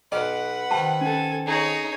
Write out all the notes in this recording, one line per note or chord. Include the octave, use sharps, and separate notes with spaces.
B1 B4 D#5 F5 F#5 D6
C3 D#3 G5 A5
C#4 A4 G#5
D#4 G#4 C#5